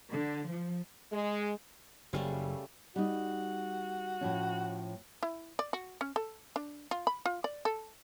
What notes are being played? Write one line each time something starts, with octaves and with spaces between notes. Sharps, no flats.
D3
F3
G#3
F#1 C#3 G3 A3
G3 D#4 F#4
A2 F3 C#4
E4
D5
F#4
C#4
A4
D4
F4
B5
F4
D5
A4